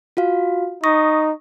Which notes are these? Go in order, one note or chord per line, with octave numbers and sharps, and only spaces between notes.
F4 F#4 F5
D#4 C#6 D#6 A#6